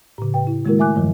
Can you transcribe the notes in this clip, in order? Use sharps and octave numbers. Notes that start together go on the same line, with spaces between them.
A2 C#3
B4 G5
E4
D#3 G#3 A#3 E4 F#4 A#4
A3 E5 G#5 D6 F#6
E2 G2 D#3 F3 F#3